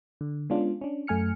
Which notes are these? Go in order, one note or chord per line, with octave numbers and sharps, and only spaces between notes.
D3
G#3 B3 C#4 D4 F4
C#4 D4
F#2 A3 G#5 F6 C#7